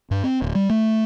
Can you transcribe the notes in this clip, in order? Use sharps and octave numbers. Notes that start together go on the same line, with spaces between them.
G2
C4
D1
G3
A3